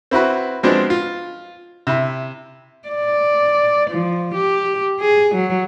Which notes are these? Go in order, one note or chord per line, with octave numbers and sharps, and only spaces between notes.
C4 E4 F#4 B4
F3 F#3 G#3 B3 C4 D4
F4
C3 E4
D5
F3
G4
G#4
F#3